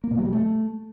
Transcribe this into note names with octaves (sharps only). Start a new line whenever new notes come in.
A#3
B2
F#3
G3
A3